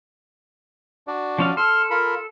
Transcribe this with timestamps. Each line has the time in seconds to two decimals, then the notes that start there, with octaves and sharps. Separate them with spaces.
1.07 D4 F#4 D5
1.38 F3 C#4 F5
1.57 A4 C6 F6
1.90 F4 A#4 B5